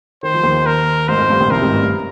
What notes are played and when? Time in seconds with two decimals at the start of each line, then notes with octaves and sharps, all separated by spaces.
0.23 D#3 C5
0.34 F3
0.43 D#2 D#3
0.66 A#4
1.08 G#1 G#2 C5
1.19 F2
1.30 G2
1.40 A#1 A#2
1.51 C2 C3 A#4
1.62 G#1 G#2
1.72 G2
1.83 G2